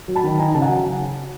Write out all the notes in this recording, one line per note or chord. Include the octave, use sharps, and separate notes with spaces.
F#3
A5 B5
D#3
D#4 G#5 A#5
C#3 A5
F#5 G#5
F#3